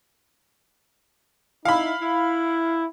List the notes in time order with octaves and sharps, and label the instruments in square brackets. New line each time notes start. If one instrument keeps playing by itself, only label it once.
[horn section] D#4 E4 [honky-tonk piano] F5 B5
[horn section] E4